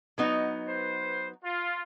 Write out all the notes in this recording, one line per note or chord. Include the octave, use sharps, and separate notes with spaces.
F#3 B3 D#4
B4 C5
F4